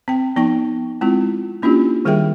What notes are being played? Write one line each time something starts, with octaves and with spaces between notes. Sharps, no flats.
C4 G5
F3 B3 D#4 G5 C#6
G#3 C4 E4 F4
A#3 C#4 D4 E4 F4 G4
D#3 G3 G#4 A#4 E5 G5